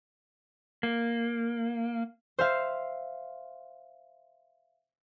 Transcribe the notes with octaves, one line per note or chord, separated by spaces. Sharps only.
A#3
C5 E5 F5